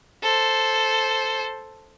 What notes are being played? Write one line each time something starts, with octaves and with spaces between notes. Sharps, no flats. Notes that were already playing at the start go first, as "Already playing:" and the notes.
A4 C5